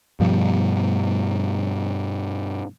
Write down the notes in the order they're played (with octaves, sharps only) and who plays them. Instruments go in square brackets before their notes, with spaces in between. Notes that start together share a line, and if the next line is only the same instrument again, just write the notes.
[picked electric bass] G2 B2 F3 G3